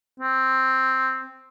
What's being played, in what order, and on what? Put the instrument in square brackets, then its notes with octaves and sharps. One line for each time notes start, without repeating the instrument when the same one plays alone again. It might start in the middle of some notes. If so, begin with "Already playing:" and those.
[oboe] C4